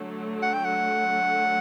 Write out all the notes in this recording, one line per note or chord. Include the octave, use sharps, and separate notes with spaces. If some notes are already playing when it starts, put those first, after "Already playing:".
Already playing: D3 F#3 A3
F#5
G5
F#5